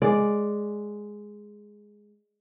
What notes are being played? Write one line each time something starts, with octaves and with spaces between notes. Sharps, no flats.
G#3 D5